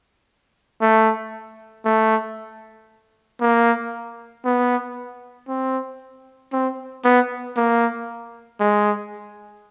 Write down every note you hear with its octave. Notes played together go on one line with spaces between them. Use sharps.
A3
A3
A#3
B3
C4
C4
B3
A#3
G#3